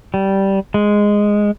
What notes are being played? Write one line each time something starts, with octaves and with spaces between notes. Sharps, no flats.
G3
G#3